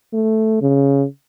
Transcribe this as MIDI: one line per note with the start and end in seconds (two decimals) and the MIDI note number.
0.13 0.60 57
0.62 1.05 49